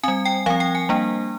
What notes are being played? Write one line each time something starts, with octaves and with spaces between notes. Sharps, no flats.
G3 C4 G#5
G5
F3 C4 F5
G5
G#5
G3 A#3 D4